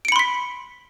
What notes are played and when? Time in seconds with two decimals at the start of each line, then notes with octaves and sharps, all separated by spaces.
0.05 D7
0.08 C#7
0.12 B5
0.16 C6
0.19 B6